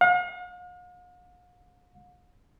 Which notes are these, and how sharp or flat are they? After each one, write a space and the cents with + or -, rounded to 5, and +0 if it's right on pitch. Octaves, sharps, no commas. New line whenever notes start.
F5 +45